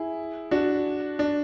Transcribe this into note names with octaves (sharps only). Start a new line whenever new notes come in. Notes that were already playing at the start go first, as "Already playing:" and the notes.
Already playing: E4 G#4
D4 F#4
D4